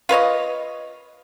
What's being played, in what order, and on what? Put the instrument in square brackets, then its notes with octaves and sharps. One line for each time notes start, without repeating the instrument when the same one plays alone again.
[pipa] F4 B4 C#5 D#5